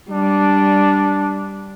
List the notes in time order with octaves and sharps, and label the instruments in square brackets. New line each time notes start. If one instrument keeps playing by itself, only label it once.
[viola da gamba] G3 [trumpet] D4